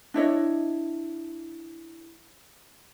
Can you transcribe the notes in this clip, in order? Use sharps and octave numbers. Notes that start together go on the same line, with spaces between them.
D4 E4 C#5 D#5